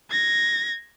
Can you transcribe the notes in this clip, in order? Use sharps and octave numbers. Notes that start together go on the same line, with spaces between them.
G#6 A#6